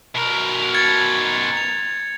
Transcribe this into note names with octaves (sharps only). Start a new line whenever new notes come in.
B2 A#4
G#6 A6 C#7
F7